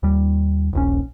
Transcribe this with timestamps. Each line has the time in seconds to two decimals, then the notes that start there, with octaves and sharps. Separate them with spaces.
0.03 D#2 G3
0.73 D#1 A#1 C#4